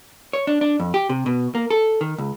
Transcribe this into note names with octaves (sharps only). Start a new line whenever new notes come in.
C#5
D4
D4
F2
G4
C3
B2
A#3
A4
D#3
C#2